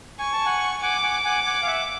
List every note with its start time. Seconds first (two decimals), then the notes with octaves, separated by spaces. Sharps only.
0.19 G#5 C#6
0.32 A5
0.45 F#5 G#5
0.82 F#5 G#5 D6
1.03 F#5 G#5
1.25 F#5 G#5
1.46 F#5 G#5
1.62 F5
1.67 E5 F#5